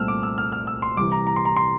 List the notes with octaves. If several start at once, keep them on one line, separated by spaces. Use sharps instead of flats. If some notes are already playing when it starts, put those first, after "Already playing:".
Already playing: C2 A#2 A3 C4 E6 F6
D6
E6
F6
F6
E6
C6
C2 C3 E3 D6
A#5
A#5
C6
A#5
C6